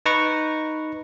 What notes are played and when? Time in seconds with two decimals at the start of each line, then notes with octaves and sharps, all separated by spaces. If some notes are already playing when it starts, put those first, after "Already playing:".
0.06 D#4 B4 A#5 C#6